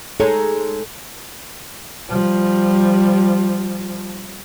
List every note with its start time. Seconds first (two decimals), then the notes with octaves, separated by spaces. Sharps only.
0.20 G#3 D#4 A4 C#5
2.10 F3 G3